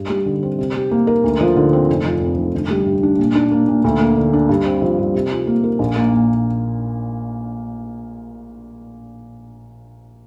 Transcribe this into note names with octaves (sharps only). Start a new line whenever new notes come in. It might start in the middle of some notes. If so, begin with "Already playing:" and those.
Already playing: G2
G3
D3
C4
C3
G4
A#3
A#4
D2
F3
D3
C4
F1
F3
F2
F1
G1
G3
G2
D4
A#2
D4
A#3
A#2
D2
A#3
D3
D4
G2
C4
F3
G2
C3
F4
A#3
A#4
A#1
A#3
A#2